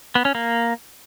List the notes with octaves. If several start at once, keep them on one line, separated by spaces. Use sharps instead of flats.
B3
C#4
A#3